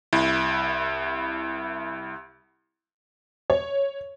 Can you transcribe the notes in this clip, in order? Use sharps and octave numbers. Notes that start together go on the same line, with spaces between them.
C2 E4
C#5